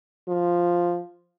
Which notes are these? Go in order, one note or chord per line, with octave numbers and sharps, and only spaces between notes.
F3